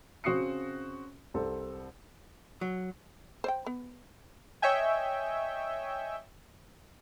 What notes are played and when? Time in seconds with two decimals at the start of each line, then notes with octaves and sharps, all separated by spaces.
0.24 C#3 C4 F#4 D#6 C7 C#7
1.34 C2 C4 A4
2.61 F#3
3.44 C5 D5 G5
3.66 B3
4.62 C#5 D#5 E5 G5 G#5